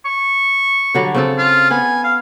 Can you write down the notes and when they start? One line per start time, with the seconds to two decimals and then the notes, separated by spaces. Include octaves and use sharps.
0.06 C#6
0.95 D3 F#3 G3
1.15 C#3 C4 A4
1.38 F4
1.71 B3 G#5
2.04 F5